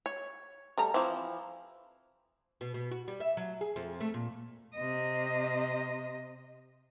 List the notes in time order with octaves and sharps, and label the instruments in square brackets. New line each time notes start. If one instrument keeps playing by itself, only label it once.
[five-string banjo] C#5
[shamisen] G3 A3 A#5
[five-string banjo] E3 F3 [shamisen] C4
[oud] B2
B2
F#4
G3
E5
F#3
G#4
F2
A3
A#2
[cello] C3 D#5